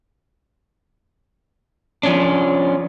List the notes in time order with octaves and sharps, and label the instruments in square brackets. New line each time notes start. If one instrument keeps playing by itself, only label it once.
[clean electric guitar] F3 C#4 D4